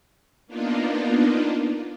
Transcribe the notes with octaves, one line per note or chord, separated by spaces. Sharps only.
A#3 B3 D4 D#4 F4